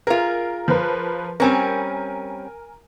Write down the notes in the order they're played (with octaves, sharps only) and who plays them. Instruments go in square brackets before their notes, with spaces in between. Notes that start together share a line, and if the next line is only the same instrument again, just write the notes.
[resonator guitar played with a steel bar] F4 G#4 [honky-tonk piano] A#4
[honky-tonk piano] F3 A#4 B4
[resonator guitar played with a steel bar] G3 C4 C#4 [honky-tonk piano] A#4 G#5